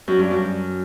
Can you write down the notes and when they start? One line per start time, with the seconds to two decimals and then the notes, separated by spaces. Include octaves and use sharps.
0.08 F#2
0.19 G2
0.31 F#2